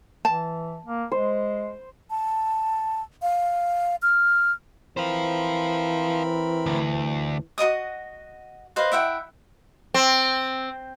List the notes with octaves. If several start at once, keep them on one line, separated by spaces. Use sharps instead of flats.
E3 A5
A#3
G#3 C5
A5
F5
F6
E3 C4 A#4 C5 F5 B5
D2
F#4 A#4 D#5 D#6
B4 C5 D#5 F5
E4 E5 F#5 G5
C4